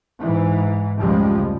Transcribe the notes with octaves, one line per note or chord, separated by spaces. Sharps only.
G#2 E3
F1 C#2 F3 G3 G#3